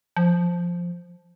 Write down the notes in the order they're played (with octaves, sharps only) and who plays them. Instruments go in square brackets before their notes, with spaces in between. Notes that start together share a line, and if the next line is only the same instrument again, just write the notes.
[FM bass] F3